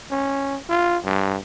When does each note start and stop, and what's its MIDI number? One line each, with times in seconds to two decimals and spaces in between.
0.11 0.57 61
0.69 0.97 65
1.04 1.36 43